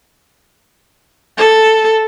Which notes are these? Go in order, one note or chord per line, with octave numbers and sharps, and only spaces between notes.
A4